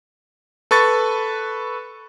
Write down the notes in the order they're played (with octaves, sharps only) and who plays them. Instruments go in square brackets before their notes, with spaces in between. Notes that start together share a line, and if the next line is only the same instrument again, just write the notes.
[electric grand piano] A4 B4 C#6 A6